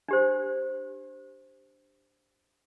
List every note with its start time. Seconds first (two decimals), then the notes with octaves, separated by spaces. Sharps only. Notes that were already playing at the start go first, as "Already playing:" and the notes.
0.08 D4 G4 C5